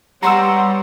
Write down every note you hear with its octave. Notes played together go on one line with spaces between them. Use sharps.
G3 B3 C#5 F#5 A#5 C6 E6